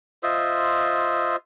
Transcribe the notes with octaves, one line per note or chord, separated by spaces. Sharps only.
F4 C5 D#5 E5